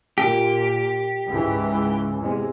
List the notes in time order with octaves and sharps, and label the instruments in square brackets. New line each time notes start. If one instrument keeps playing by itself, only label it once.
[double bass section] A#2 [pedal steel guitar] G4
[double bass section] C#2 G#2 E3
E2 C3 G#3